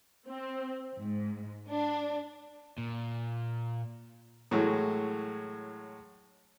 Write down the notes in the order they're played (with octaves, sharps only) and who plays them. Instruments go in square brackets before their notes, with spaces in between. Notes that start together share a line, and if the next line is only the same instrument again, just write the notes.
[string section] C4
G#2
D4
[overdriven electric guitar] A#2
[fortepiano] A2 E3 F#3 G#3